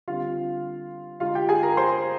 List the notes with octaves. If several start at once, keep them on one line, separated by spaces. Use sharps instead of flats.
D3 G3 C4 F4 F5
D3 G#3 D#4 F4 F5
G4 G5
G#4 G#5
A#4 A#5
C5 C6